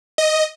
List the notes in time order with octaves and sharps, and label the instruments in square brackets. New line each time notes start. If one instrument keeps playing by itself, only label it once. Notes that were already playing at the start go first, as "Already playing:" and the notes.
[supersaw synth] D#5